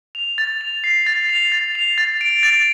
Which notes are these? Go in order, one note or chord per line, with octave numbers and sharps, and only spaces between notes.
F7
A6
F7
C7
A6
F7
A6
F7
A6
D7
A6